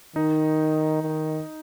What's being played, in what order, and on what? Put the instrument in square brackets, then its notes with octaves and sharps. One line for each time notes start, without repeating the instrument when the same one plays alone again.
[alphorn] D#3 [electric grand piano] D#4
[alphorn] D#3